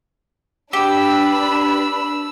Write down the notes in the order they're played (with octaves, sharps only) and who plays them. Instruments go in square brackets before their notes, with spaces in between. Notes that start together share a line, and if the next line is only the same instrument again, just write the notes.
[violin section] D4 B4 B5 [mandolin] G4 [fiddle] E6